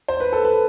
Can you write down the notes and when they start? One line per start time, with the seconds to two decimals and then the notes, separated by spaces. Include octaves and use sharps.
0.08 C5
0.20 B4
0.33 A4
0.45 B4